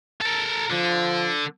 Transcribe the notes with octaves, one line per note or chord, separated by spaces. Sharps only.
A4 A#4
D3 F3